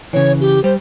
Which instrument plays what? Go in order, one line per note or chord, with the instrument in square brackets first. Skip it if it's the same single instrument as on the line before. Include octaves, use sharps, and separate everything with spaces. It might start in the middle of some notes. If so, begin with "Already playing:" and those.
[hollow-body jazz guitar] C#3 E3 [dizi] C#5
[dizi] G4
[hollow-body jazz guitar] G3 [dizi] C5